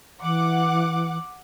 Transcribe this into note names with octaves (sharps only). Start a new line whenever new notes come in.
E3 F#5 D6